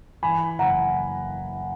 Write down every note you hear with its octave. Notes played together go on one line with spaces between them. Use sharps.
E3 G#5 B5
F#1 F#5 A#5